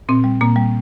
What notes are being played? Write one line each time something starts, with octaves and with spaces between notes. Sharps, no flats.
A#2 C4
G3
A#2 A#3
G3